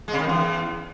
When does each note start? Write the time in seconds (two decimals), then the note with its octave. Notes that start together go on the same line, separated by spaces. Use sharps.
0.08 G#3
0.13 C#3
0.19 D#3
0.24 F2
0.29 E2